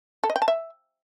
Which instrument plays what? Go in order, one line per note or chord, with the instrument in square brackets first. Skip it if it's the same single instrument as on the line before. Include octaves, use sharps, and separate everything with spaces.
[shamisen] A4
D#5
G5
A5
E5